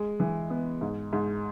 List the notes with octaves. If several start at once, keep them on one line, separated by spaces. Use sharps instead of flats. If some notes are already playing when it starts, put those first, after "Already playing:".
Already playing: G#3
E3
B3
G#2
G#2